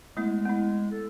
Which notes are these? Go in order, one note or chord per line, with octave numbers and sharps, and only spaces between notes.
G#3 A3 B3 E4
B3 E4
A4